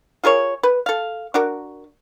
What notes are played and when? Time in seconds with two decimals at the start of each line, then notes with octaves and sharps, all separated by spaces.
0.24 F4 G#4 A#4 C#5
0.63 B4
0.86 A4 F5
1.34 D4 F#4 A#4